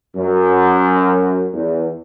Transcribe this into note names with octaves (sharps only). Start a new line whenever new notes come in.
F#2
E2